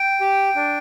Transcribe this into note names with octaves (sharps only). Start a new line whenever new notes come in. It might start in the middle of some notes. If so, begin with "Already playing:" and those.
Already playing: G5
G4
D4